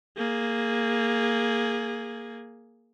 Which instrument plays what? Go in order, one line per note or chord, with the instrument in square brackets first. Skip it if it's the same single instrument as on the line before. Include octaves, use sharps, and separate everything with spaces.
[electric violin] A#3 G#4